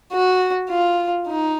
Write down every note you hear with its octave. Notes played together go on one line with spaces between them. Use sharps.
F#4
F4
D#4